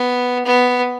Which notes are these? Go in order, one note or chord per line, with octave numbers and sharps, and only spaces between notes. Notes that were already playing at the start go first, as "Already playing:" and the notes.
Already playing: B3
B3